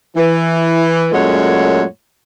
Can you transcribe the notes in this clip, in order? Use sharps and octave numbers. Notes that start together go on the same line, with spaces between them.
E3
F#2 A#2 G#3 A3 C#5 F#5